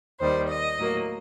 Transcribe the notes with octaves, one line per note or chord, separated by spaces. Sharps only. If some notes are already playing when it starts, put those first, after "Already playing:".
D#2 D#3 G3 C5
D#5
A2 F#3 A#3